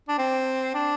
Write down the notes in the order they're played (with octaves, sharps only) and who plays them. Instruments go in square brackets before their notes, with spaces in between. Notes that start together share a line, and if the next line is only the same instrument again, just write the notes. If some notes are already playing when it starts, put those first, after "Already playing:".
[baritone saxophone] D4
C4
D4